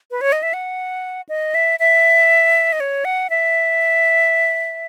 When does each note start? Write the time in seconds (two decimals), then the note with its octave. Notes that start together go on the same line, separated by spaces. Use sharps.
0.11 B4
0.21 C#5
0.32 D#5
0.43 E5
0.54 F#5
1.29 D#5
1.55 E5
1.79 E5
2.73 D#5
2.80 C#5
3.05 F#5
3.30 E5